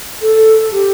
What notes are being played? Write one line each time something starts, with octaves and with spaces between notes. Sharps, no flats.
A4
G4